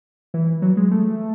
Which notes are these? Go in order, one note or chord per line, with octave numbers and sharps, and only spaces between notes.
E3
F#3
G#3
A3